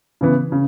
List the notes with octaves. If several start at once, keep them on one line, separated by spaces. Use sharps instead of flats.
C#3 E3 B3
C#3